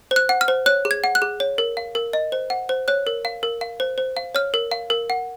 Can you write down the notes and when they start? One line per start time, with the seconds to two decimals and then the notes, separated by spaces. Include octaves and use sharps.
0.11 C5
0.16 F#6
0.29 F#5
0.41 F6
0.48 C5
0.66 C#5 F#6
0.85 G#4
0.91 G#6
1.04 F#5
1.15 F#6
1.22 G#4
1.40 C#5
1.58 A#4
1.77 F5
1.95 A#4
2.13 D#5
2.32 C5
2.50 F#5
2.69 C5
2.88 C#5 F#6
3.07 A#4
3.25 F5
3.43 A#4
3.61 F5
3.80 C5
3.98 C5
4.17 F5
4.35 C#5 F6
4.54 A#4
4.71 F5
4.90 A#4
5.10 F#5